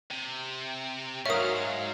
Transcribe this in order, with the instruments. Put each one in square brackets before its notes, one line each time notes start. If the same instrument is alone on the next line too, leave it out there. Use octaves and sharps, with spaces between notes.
[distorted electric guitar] C3
[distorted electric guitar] G#2 [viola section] F#3 F5 [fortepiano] A#4 C#5 [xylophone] E5 D#6